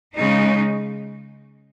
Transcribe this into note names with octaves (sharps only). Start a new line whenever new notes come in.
C#3 G#3 D#4